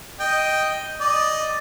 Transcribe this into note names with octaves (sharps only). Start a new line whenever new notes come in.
D#5 G5
D5 D#5